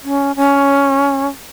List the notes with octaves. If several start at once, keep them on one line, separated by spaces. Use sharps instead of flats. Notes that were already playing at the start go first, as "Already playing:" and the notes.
C#4
C#4